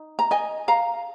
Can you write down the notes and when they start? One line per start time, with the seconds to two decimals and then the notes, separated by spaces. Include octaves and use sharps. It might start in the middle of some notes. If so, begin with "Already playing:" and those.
Already playing: D#4
0.19 A#5
0.31 D#5 G#5
0.68 F5 A#5